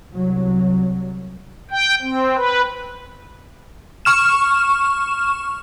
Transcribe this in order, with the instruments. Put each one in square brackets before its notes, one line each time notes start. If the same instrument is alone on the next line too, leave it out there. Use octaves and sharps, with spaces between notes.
[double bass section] C2 F#3
[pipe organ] G5
C4
B4
[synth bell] C#6 F6 E7